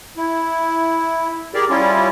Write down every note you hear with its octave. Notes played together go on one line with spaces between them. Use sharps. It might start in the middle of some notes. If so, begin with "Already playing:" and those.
E4
G4 G#4 A#4 D5
G3 C#4 E4 F4